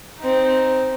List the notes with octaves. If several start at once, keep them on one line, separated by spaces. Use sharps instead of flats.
C4 D#4